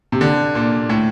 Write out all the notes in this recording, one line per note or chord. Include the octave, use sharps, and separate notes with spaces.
C3
D3
A#2
A2